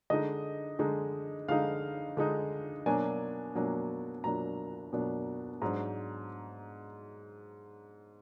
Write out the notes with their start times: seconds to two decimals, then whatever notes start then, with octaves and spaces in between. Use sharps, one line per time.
0.10 D3 G#3 D#4 D#5
0.79 D3 G#3 D#4
1.48 D3 G#3 D#4 F5
2.17 D3 G#3 D#4
2.86 B2 F#3 A#3 D4 G#5
3.55 B2 F#3 A#3 D4
4.24 B2 F#3 A#3 D4 A#5
4.93 B2 F#3 A#3 D4
5.62 G#2 F#3 D4 A#5